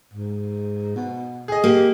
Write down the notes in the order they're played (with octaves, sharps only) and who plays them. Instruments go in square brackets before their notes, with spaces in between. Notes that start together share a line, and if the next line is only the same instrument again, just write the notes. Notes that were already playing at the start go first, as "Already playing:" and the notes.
[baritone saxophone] G#2
B2
[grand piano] G#4 D#5
[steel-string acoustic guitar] A#3 [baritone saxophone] G4